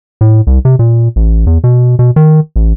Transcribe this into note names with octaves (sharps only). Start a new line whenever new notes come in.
A2
C2
C3
A#2
A1
E2
B2
B2
D#3
A1